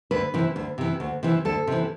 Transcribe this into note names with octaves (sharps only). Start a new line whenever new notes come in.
D2 B4
C3 E3
D2
C3 E3
D2
C3 E3
D2 A4
C3 E3